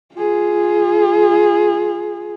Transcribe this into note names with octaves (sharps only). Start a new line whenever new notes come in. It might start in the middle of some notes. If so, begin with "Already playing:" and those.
F4 G#4